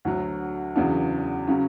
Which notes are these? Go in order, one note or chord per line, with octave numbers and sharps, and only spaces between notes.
D2 D3 F#3
E2 C#3 F#3 B3 D4
C#3 F#3 C#4